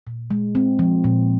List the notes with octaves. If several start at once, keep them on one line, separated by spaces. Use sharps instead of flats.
A#2
G#3
C4
F3
A#2